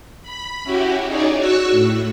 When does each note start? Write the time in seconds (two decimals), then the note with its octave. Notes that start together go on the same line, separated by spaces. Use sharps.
0.23 B5
0.63 C#4 E4 F#4 G4
1.05 D#4 G#4 C#5 D5
1.37 F#4 F#5 C#6 E6 F#6
1.71 A2